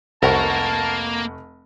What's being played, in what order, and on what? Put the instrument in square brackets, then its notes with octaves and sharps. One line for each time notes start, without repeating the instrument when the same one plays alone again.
[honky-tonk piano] F1 F#5 C#6 [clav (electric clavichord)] C2 [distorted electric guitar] A#3 A#4 [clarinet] A5